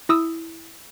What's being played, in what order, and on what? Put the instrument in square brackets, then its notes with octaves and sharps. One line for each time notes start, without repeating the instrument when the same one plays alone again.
[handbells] E4 D#6 E6